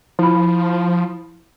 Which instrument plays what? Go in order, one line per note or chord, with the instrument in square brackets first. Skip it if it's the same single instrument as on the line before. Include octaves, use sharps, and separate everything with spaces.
[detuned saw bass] F3 [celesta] E4 B5